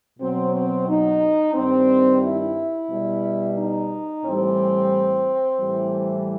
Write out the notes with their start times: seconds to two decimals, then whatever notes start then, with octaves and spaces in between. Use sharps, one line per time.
0.20 B2 F#3 C4
0.54 C4
0.87 D#4
1.54 G2 D#3 G3 C4
2.22 E4
2.90 B2 G3
3.57 D#4
4.24 A2 E3 G3 C4
5.59 A2 E3 G3